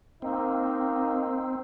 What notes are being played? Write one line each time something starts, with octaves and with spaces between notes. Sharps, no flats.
A#3 C4 D#4